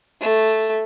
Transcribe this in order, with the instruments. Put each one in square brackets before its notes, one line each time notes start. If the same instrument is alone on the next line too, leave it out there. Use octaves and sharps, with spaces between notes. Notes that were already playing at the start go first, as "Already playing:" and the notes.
[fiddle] A3